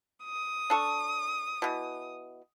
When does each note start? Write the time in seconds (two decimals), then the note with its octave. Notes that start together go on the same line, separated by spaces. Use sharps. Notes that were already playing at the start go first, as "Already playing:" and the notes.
0.25 D#6
0.70 D4 A4 C#6
1.62 B2 E3